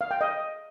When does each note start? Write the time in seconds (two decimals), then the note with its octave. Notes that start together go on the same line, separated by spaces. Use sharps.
0.01 F5
0.11 G5
0.21 D#5